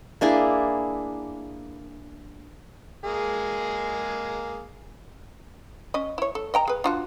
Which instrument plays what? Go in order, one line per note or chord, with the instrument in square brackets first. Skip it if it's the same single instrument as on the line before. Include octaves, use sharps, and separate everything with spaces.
[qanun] A#3 D4 E4 G#4
[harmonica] G#3 A#3 G#4
[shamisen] C#4 D#5
E4 C#5
A4
D#5 G5 A#5
G#4 B4
D4 F4 F#4